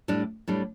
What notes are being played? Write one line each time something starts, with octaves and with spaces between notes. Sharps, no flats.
A2 G3 D4
A2 G3 D4